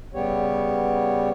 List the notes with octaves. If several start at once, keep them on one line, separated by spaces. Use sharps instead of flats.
C#3 G3 B3 G4 C#5